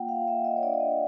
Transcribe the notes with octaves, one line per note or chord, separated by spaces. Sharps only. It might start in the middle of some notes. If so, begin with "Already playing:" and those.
Already playing: A#3 F4 F#5 G5
F5
A#3 E5
D#5
C#5
D4 D5
D5
D#5